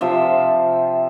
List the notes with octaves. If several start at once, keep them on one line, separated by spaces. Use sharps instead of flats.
C3 F3 E5